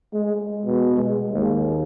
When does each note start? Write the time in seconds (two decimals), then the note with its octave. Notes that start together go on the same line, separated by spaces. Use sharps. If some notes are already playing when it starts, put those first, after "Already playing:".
0.13 G#3
0.65 B2
0.97 G#3
1.33 D#2